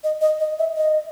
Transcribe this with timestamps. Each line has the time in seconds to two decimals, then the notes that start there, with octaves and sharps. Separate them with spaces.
0.04 D#5
0.21 D#5
0.40 D#5
0.59 E5
0.77 D#5